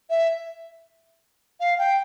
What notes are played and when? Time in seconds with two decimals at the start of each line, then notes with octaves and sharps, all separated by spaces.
0.10 E5
1.60 F5
1.79 G5